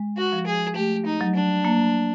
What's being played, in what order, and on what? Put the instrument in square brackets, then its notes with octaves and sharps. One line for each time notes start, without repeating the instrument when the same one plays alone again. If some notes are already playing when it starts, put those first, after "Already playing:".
Already playing: [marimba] G#3
[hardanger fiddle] F#4
[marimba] F3
[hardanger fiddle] G#4
[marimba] A3 [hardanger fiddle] G4
[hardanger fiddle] D#4
[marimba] F#3
[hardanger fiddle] D4
[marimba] A#3